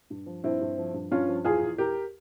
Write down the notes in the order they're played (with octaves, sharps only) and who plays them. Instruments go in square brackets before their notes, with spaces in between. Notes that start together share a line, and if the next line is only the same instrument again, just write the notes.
[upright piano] G2
F3
G2 C4 E4
G2
F3
G2
G2 C#4 F4
F3
E2 F4 G#4
E2
E2 G4 A#4